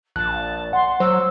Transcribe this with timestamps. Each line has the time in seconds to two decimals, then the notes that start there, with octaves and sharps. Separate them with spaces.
0.16 A#1 A5 F#6
0.73 F#5 C6
1.00 F#3 C5 E6